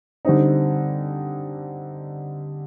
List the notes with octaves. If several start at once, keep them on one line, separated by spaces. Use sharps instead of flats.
D3 G3 C4 D#4